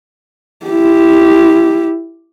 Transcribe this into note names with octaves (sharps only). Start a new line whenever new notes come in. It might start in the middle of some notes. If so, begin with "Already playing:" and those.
E4 G4